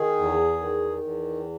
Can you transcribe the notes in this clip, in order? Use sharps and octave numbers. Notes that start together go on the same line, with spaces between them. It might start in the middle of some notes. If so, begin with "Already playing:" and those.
Already playing: D#3 G#4
E2
D#3
E2